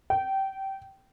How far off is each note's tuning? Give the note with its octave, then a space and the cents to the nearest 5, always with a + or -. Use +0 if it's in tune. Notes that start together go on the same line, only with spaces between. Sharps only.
G5 -20